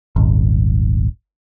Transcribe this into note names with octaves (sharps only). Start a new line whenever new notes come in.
D#1 G#1